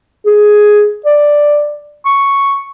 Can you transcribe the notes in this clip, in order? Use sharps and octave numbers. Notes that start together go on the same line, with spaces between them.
G#4
D5
C#6